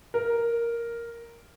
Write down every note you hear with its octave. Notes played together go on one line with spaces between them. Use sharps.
A#4